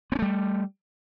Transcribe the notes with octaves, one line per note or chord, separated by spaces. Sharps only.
G3 A3 B3 C#4